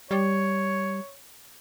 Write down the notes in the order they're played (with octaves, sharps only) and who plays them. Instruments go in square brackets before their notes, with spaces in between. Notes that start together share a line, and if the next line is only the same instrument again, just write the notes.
[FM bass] G3 [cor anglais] C#5